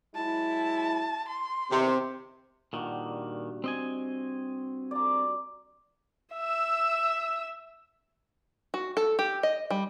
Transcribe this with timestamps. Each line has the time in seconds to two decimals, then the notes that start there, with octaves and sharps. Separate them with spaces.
0.15 F#3 G#3 E4 A5
1.28 C6
1.71 E2 C3 D#3
2.73 G2 A#2 D#3 F#4
3.64 C4 D#5 G#5
4.91 D5 A#5
6.35 E5 E6
8.74 F#4
8.97 A4
9.19 G4
9.43 D#5
9.70 G3